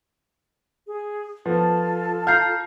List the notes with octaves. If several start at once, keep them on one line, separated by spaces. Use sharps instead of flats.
G#4
F3 B3 F4 A4 A5
F5 A#5 F6 G6 C7